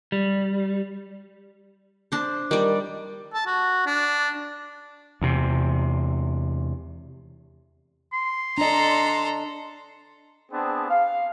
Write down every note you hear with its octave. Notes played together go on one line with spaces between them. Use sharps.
G3
D4 C5
D#3 G3 D5
A5
F#4
D4
E2 C3
C6
D4 A4 D#5 A#5
B3 C4 D4 G#4 A5
F5